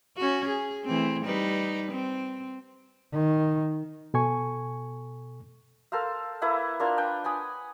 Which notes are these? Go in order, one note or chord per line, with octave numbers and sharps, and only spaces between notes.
C#4 F#4
G#4
E3 A3 C4
G3 D#4 B4
C4
D#3
B2 A4 G#5 C#6
A4 A#4 C5 F5
A#3 E4 B4 F#5
A#3 D4 F4 A#4
D4 B4 G5
F#5 G#5 B5 D#6